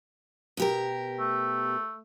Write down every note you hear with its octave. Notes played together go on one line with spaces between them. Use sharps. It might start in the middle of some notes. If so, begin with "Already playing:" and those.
B2 G4 A#4
A3